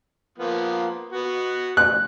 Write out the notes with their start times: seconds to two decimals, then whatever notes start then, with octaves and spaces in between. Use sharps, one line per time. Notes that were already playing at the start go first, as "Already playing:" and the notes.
0.38 F3 A#3 B3
1.12 B3 F#4
1.77 F#6